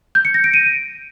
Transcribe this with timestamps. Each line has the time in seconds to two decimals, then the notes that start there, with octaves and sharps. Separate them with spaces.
0.15 G6
0.25 C#7
0.34 A#6
0.44 D7
0.54 D#7